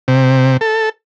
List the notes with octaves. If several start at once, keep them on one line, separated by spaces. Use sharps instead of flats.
C3
A4